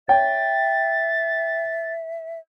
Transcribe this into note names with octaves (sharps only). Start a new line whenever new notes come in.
C#5 E5 G5 A6